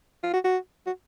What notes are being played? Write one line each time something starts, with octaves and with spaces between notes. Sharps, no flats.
F4
F#4
F#4
F#4